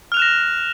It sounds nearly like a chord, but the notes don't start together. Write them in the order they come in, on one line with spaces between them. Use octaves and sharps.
F6 F7 F#6 E7 A#6